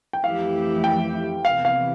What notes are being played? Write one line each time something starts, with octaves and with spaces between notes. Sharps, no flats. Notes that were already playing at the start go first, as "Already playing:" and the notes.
G5
F2 E3 A3 E4 G4 F5
G5
E2 C3 E3 F5
F5